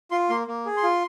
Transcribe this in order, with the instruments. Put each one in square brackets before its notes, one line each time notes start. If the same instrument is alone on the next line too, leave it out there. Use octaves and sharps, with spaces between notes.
[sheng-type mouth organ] F4 C6
A#3 C6
A#3
G#4
C6
F4